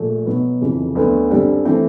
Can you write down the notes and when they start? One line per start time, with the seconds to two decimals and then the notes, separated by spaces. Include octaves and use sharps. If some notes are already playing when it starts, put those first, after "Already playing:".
Already playing: A#1 A#2 A3
0.26 B2 F#3 B3
0.61 F1 F2 C#3 E3
0.95 D2 D3 F#3 B3
1.30 F#2 D3 G3 C4
1.65 E3 A3 C4 E4